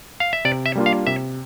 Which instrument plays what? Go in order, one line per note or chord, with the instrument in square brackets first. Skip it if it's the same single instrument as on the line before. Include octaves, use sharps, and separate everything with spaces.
[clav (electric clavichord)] F5
E5
[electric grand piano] C3 [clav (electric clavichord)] D5
[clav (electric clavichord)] E5
[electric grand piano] G3 A#3 D4 F4
[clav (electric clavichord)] F5
[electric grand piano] C3 [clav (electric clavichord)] E5